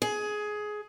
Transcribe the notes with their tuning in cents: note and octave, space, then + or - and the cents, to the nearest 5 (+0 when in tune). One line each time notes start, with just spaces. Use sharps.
G#4 +15